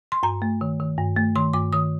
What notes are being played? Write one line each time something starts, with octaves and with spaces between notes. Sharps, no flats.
C6
G2 A#5
A3
D#3
D#3
G2
A3
D#3 C6
G2 D6
D#3 D#6